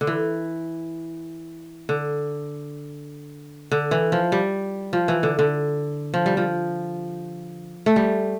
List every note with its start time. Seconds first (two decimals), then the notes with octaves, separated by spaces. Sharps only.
0.01 D3
0.07 E3
1.89 D3
3.72 D3
3.91 E3
4.12 F3
4.32 G3
4.93 F3
5.08 E3
5.23 D3
5.39 D3
6.14 F3
6.26 G3
6.37 F3
7.86 A3
7.96 G3